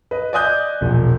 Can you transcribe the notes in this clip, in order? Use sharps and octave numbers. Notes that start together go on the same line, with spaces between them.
B4 D#5
D5 D#5 G#5 D#6 F#6 G6
E1 A#1